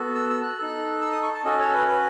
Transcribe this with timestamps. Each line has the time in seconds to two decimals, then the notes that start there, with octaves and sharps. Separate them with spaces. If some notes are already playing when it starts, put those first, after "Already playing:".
Already playing: B3 F#4 A4
0.15 E6
0.30 E6
0.43 F#6
0.58 D#4 A4
1.01 E6
1.12 D#6
1.23 C#6
1.34 A5
1.44 C#4 F#4 A4 D#5
1.60 C#5
1.68 A4
1.74 B4
1.88 B4